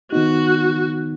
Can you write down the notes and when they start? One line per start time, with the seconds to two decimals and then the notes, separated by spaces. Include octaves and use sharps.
0.12 D#3 B3 D#4 F#4